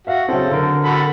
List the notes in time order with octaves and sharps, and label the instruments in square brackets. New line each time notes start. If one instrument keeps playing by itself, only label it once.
[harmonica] F#4 [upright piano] E5 F5
[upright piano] C#3 F#3 C4 [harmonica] A4
[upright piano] D3 A#4
[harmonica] F#4 A4 B5